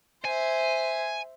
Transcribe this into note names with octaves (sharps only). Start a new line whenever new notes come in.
C5 E5 G#5